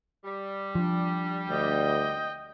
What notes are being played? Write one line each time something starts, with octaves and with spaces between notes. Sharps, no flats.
G3
F3 D4
D2 D#5 G5